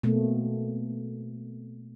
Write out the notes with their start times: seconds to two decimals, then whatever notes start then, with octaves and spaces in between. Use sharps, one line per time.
0.03 B2 A3 A#3 C4